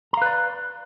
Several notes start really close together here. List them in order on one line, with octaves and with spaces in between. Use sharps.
A#5 F5 B4 D5